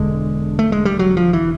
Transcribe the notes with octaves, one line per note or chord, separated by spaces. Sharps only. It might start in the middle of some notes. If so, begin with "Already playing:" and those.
Already playing: E1 D3 G#3
A3
G#3
G3
F#3
F3
E3